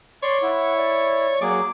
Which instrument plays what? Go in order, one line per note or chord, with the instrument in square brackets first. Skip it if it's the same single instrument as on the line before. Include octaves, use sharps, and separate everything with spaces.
[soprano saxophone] C#5 [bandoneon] D5 C6
[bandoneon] E4 [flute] F#5
[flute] D5
[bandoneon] F#3 A#3 G#4 [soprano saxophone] D6